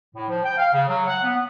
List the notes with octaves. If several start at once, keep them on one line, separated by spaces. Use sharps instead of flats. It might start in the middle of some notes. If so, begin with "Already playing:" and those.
A2
F3
G5
F5
C#3
F#3
F#5
B3
B3